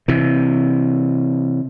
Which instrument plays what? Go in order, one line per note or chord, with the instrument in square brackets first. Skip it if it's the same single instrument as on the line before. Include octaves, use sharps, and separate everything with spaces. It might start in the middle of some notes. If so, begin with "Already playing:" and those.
[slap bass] C3 E3